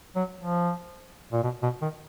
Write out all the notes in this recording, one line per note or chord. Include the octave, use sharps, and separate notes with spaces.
F#3
F3
A#2
B2
B2
D#3